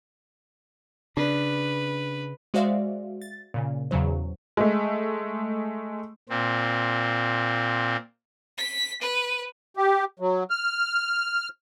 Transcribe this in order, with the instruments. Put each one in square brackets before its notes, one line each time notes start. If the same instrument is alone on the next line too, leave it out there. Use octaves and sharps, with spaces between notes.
[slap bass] C#3 [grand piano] D4 [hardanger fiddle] B4
[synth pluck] G#3 F#4 C5 D5 E5 F5
A6
A#2 C#3
E2 C#3 F#3 C5
[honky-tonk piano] G#3 A3
[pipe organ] A#2 C4
[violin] B6
B4
[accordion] G4
F#3
F6